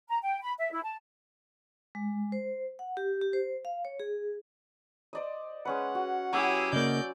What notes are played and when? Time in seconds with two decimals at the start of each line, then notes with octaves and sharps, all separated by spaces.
0.09 A#5
0.22 G5
0.41 B5
0.59 E5
0.71 E4
0.84 A5
1.95 G#3
2.32 C5
2.79 F#5
2.97 G4
3.21 G4
3.33 C5
3.65 F5
3.85 C#5
4.00 G#4
5.13 C5 D5 D#5
5.65 G#3 C#4 B4 F#5
5.95 F#4
6.33 F#3 C#4 E4 G4 G#4 E6
6.73 C#3 A#3 D5 D#5 G6